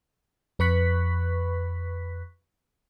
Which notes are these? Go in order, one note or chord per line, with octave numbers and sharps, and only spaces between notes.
F2 B4 B5 C#6 F#6 B6